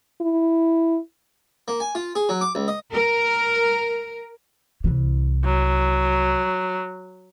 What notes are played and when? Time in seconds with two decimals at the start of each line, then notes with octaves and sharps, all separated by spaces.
0.21 E4
1.68 A#3
1.80 G#5
1.95 F4
2.15 G#4
2.29 F#3
2.41 D6
2.55 C#2
2.68 D#5
2.94 A#4
4.84 C2 E3
5.45 F#3